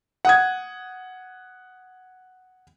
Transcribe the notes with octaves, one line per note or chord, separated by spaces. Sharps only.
F#5 D#6 G#6